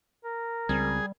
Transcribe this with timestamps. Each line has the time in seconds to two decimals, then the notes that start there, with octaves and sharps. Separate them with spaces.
0.24 A#4
0.69 C#2 G3 C4 G#4